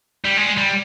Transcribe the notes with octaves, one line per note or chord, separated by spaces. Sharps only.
G3
G#3
G3